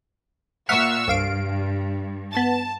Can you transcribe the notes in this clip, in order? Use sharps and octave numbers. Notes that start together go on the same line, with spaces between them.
A#2 E5 F#5 C#6 E6 F6
C2 G2 F5 D7
B3 A5 A6